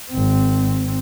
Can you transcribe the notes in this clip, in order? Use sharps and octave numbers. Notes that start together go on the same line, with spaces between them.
G#1 C4